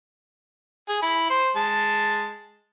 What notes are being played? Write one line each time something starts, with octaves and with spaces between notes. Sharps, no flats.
G#4
E4 B5
C5 C6
G#3 A5